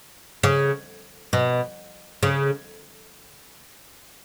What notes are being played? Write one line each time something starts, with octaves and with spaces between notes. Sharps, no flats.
C#3
B2
C#3